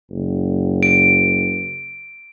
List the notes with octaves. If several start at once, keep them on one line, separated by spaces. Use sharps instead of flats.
F#1
D7